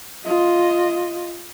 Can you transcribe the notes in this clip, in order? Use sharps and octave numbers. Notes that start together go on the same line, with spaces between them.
F4 D#5